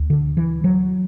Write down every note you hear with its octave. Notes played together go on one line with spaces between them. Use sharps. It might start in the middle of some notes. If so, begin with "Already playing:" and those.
Already playing: D2
D3
E3
F#3